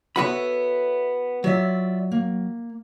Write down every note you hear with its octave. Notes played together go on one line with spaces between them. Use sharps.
B3 F#4 A4 C#5 E5 B5
F#3 F4 D5 E5
A#3